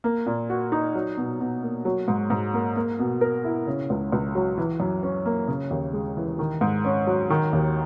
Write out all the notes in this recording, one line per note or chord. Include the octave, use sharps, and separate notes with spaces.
A#3
A#2
F#4
D#4
F#3
B2
B2
A#3
F#3
G#2
G#2
A#3
A#3
B2
A#4
E4
C#3
C#2
C#2
F#3
E3
F#2
C#4
A#3
C#3
D#2
G#3
E3
D#3
G#2
C#4
F#3
D#3
D#2